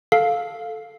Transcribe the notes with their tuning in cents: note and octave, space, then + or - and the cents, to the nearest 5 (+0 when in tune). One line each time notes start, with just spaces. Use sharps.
A4 +0 F5 +5